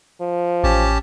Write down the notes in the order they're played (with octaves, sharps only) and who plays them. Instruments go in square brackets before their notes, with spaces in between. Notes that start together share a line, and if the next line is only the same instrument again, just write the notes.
[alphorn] F3
[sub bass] A1 [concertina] C#4 G4 A5